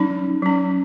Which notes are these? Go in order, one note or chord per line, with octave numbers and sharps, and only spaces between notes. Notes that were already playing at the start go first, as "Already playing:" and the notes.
Already playing: F#3 C#4 D#4
F#3 C#4